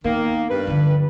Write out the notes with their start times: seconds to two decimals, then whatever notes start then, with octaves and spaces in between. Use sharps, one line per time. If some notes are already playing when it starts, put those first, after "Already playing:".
0.04 D#3 A#3 B3
0.50 G2 B4
0.67 D3 F3